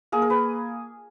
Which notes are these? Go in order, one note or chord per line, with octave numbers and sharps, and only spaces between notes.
A#3 G#4
A#4
B4